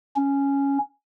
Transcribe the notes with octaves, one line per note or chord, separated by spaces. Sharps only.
C#4